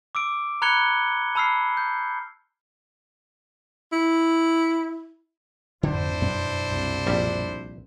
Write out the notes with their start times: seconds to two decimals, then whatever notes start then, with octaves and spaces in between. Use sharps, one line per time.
0.15 D6 E6 D7
0.62 A#5 B5 F#6 G#6 C#7 G7
1.35 A5 B5 E6 F6 C7
1.77 G6
3.92 E4
5.83 G#1 F2 D3 D4 E4 C5
6.21 F#2 B2 B3
6.67 C2
7.07 A#1 G3